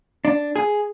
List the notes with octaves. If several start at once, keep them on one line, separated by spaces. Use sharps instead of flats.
D4
G#4